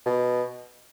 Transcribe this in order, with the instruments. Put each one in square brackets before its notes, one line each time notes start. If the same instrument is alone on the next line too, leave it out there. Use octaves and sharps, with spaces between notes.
[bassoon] B2